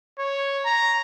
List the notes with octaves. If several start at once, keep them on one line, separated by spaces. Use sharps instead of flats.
C#5
A#5